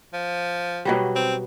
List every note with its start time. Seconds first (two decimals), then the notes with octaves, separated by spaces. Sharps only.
0.13 F3
0.85 B2 F#3 G3
1.16 C4